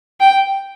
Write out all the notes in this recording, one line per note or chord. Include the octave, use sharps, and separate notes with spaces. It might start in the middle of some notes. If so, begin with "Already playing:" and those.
G5